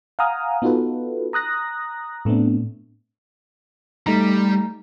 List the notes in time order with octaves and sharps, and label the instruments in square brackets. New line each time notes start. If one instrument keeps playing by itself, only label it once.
[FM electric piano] F5 F#5 G#5 A#5 D#6 F6
B3 D#4 F4 F#4 A4 B4
A#5 D#6 F#6 A#6
A2 A3 B3 C4 D4
[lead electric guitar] G3 [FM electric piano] A3 D#4 A#5